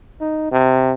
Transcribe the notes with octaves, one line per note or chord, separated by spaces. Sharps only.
D#4
C3